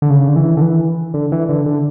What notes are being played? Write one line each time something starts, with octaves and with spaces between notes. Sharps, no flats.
D3
C#3
D3
E3
D3
E3
D3
E3
D3
D3